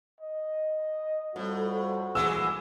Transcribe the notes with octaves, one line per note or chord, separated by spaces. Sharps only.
D#5
F2 A2 G3 F#4
E3 G#3 E6